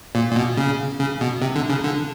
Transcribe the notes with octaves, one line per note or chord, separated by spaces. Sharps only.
A#2
A#2
B2
C#3
C#3
B2
C3
D3
C#3
D3